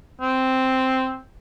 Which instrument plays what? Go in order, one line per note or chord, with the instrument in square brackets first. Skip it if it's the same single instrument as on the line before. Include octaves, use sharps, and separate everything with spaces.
[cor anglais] C4